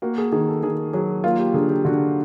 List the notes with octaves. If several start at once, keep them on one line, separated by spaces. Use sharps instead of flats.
A#3 F#4
G#4
D#3 G#4
A4
D#3 G#4
F#3 G#4
A#3 F4
G4
D3 G#4
G4
D3 F#4